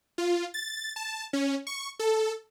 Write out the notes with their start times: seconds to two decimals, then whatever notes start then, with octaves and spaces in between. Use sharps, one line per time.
0.18 F4
0.54 A6
0.96 A5
1.33 C#4
1.67 C#6
1.99 A4